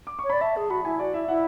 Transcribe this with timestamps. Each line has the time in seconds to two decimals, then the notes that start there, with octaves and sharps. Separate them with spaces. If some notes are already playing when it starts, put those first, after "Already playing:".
0.07 D6
0.19 C#6
0.24 C#5
0.30 D5 B5
0.41 E5 A5
0.56 G#4 A5
0.70 F#4 B5
0.85 E4 G#5
0.99 F#4 D5
1.14 E4 E5
1.28 E4 F#5